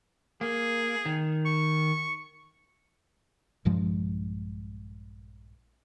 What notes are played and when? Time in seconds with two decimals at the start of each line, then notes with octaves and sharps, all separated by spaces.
0.41 A#3 G#4
1.06 D#3
1.45 C#6
3.65 A#1 G2 F3 G#3